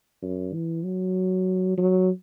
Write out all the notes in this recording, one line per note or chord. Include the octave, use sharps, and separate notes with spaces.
F#2
E3
F#3
F#3